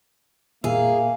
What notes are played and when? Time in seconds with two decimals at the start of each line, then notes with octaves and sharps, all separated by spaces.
0.64 A#2 A#3 G#4 E5 F5